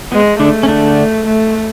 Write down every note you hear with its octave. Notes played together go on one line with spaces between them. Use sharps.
G#3 B3
D3 A3 D4
C#4
D3 D4
A3